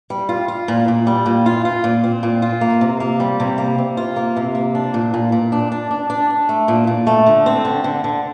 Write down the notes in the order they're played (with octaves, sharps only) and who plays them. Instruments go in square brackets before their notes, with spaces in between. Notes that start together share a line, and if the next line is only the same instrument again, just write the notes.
[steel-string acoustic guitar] G3
F4
F4
A#2
A#2
G3
A#2
F4
F4
A#2
C4
A#2
F4
A#3
C3
A#3
G3
C3
A#3
C3
F4
A#3
C3
A#3
D4
A#2
A#2
A#2
D4
D4
D4
D4
D4
A3
A#2
A#2
A3
D3
C4
D3
D3
D3